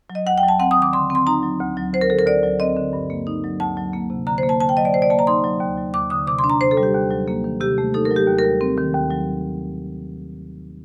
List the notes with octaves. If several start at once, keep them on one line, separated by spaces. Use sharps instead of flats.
F#3
D#5
D#2 F#5
G5
F#3
A5
C4 F#5
D#6
D#3
D6
D3 C6
C4
C6
D#4 A#5
F#3
D2
F#3
D2 C5
A#4
D3 A4
A#4
D2 D5
F#3
C4 D#5
D3
G2
A#3
D#4
F#3
D2 A5
F#3
A#3
C3
D3 A#5
C5
A#3
A5
D3 A5
G5
F#3 D#5
D5
C3 C5
D5
A#3 A5
A#5
D#4 C6
F#3
D#2
F#3
D#2 D6
D3 D#6
C3 D6
C6
D4
A#5
C3 C5
A4
G3
G4
D#2
F#3
A#3
D#3
C3 G4
A3
D#4 A4
A#4
F#3
G4
D#2
A#4
G3
C4
D#3
D#2
F#3